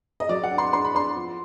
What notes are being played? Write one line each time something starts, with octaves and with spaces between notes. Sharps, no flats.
D#5
F#3 D5
F#5
D4
C6
D4 C6
B5
D4 C6
F3